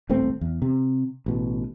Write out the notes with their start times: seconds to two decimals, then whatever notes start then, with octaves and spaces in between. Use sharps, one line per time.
0.09 D#1 A1 A3 C4
0.41 E2
0.62 C3
1.26 A1 B2